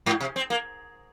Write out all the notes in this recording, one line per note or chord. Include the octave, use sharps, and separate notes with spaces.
G#2
C3
C4
A#3